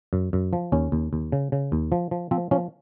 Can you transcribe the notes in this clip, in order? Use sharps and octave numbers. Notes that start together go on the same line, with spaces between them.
F#2
F#2
F3
D#2 C#4
D#2
D#2
C#3
C#3
D#2
F3
F3
F3 C4
F3 C#4